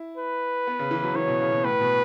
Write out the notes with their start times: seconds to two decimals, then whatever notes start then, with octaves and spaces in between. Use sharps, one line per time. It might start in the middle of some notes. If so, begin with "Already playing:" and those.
Already playing: E4
0.18 B4
0.67 B3
0.79 C#3
0.91 E3
1.04 F#3
1.15 E3 C#5
1.28 B2
1.40 C#3
1.52 B2
1.64 A2 B4
1.81 B2